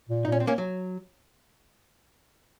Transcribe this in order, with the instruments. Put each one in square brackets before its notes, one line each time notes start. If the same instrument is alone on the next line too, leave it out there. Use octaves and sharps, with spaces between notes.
[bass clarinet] A#2
[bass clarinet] A#2 [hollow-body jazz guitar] D#4
[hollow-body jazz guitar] C#4
C4
A#3 C#4
F#3